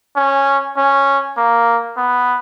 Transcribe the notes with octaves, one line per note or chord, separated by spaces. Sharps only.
C#4
C#4
A#3
B3